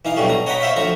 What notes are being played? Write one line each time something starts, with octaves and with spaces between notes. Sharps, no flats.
E3 D#4 F5
G2 B2 F#3 G3 A3
A#5
C#5 D#5 F#5 G5 A#5 B5
C5 C#5 E5 F5 G5 B5
D2 F3 A#5 C#6